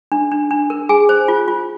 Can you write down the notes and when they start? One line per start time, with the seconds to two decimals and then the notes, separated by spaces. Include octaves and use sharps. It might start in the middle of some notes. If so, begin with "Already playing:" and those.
0.12 D4
0.32 D4
0.51 D4
0.70 A#4
0.89 G#4 G#5
1.09 C5
1.28 F4
1.48 F4